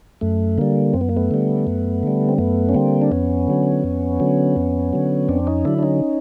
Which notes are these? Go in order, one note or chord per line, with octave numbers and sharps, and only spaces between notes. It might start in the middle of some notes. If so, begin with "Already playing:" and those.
F#2 A3
D3 G3 A#3
F#2 C4
B3
A#3
A3 B3
D3 G3
F#2
D3 G3
C4
F#2 A3 B3
C#4
D3 G3 A#3 C4
D4
F2 B3 C#4
D3 F#3
F2
D3 F#3
F2
D3 F#3
F2 C4 D4
C#4 D#4
D3 F#3 D4 E4
D4
C#4 D#4